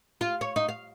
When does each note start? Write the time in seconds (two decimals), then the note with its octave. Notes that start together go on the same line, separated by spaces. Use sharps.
0.21 F4
0.41 C#5
0.56 D#4
0.69 F5